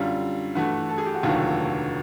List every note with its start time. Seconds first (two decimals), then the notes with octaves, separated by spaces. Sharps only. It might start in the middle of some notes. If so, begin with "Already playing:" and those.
Already playing: F#2 D3 G3 F4
0.55 G2 E3 A3 F#4
0.89 A4
0.98 G#4
1.06 G4
1.14 F#4
1.23 F1 D#2 D3 F#3 A3 F4